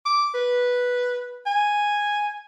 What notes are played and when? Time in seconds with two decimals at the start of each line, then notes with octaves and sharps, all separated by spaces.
0.05 D6
0.34 B4
1.46 G#5